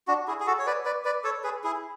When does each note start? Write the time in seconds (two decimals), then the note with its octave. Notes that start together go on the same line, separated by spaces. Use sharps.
0.07 D4 F#4
0.28 E4 G#4
0.40 G#4
0.47 F#4 A4
0.59 C#5
0.66 B4 D5
0.85 B4 D5
1.05 B4 D5
1.24 A4 C#5
1.44 G#4 B4
1.64 E4 G#4